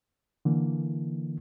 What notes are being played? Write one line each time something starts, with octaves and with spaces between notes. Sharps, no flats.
D3 E3 A#3